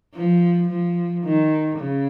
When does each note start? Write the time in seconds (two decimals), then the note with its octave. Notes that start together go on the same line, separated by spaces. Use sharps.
0.14 F3
0.68 F3
1.23 D#3
1.78 C#3